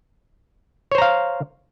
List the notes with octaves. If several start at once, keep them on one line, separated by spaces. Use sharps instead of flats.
C5 C#5 F5 A#5